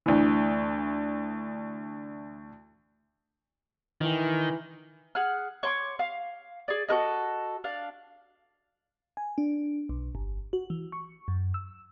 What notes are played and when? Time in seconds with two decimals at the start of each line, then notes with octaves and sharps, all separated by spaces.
0.06 D2 E3
4.01 D#3 E3
5.15 G#4 F#5 F6
5.63 C#5 C6 D6
5.99 F5
6.68 G#4 D5
6.89 F#4 A4 A#4 D#5
7.64 D4 F5
9.17 G#5
9.38 D4
9.89 B1
10.15 G1
10.53 F#4
10.70 E3
10.92 C#6
11.28 F#2
11.54 E6